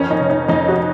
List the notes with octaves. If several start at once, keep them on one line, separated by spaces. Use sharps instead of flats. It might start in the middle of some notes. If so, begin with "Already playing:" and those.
Already playing: F2 D#3 C#4
D#4
F1
D#4
F2 D#4
F#4